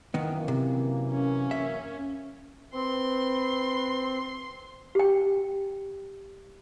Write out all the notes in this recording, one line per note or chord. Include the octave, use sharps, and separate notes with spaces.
F#2 D#3 E3 A#3 B3
C3
C#4
E5
C4 B4 C6
G4 G5